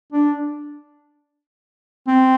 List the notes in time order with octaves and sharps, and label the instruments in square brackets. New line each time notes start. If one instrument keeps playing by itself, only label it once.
[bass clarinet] D4
C4